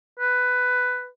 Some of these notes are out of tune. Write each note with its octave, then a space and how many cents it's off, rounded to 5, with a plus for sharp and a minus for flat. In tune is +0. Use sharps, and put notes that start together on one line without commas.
B4 +10